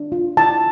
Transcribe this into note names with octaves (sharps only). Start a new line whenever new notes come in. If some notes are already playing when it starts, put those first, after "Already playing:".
Already playing: D4
F4
E4 A5